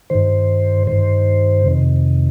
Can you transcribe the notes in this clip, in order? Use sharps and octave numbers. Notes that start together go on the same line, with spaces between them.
G2 D#3 C5
G2 D#3 C5
F2 C3 D#3